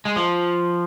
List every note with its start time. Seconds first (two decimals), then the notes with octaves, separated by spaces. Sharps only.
0.05 G#3
0.16 F3